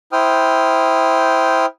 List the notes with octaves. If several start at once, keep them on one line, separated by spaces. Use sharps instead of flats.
E4 C5 G5 D#6 F6